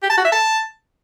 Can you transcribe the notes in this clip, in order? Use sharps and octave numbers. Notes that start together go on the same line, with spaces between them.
G4
A5
F#4
E5
A5